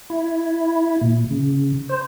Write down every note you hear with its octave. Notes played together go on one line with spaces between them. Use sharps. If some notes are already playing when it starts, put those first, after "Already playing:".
E4
A#2
C#3
C5